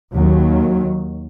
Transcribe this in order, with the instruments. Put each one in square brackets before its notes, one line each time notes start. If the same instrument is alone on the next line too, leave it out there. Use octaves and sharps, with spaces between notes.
[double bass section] D#2 D#3 F#3